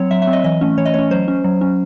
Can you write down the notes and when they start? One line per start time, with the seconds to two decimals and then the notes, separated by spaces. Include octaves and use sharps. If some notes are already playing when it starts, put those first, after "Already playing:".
Already playing: F#3 C4 C#5
0.11 F#3 E5
0.22 E5
0.27 C4
0.33 D#5
0.44 E3 D#5
0.61 A3 C#4
0.78 E3 C#5
0.86 D#5
0.94 A3 C#4 C#5
1.11 F#3 C5
1.28 C#4
1.44 F#3
1.61 C#4